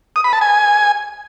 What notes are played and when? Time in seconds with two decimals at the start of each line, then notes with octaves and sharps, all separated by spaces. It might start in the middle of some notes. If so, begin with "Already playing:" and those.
0.16 D#6
0.24 B5
0.33 A5
0.41 G#5